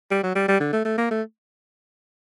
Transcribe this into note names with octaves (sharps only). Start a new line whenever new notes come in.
G3
F#3
G3
G3
D3
A3
A3
A#3
A3